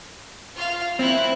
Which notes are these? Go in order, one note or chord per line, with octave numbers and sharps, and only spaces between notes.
F4 F5
C4 E4 F#6